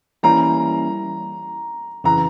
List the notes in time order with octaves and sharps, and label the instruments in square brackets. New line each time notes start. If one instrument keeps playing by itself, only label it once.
[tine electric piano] E3 G3 A#3 C#4 E4 [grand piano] A#5
[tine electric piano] F2 C#3 E3 [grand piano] A#5